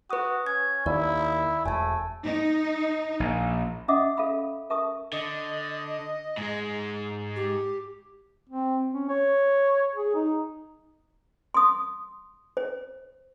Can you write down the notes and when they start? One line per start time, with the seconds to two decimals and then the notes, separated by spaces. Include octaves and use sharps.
0.10 F#4 B4 D#6
0.46 C#4 G#6
0.86 D#2 E4 D5
1.66 E1 A3 G#5 A5
2.25 D#4
3.20 A#1
3.88 C#4 D#5 E5 F#5 D6 D#6
4.17 A4 E5 F5 B5 E6
4.70 A#4 E5 A5 C#6 D#6
5.13 D3 D#5
6.37 G#2 G#3
7.36 G4
8.49 C4
8.93 C#4
9.09 C#5
9.95 G#4
10.15 D#4
11.54 C6 D#6
12.57 C5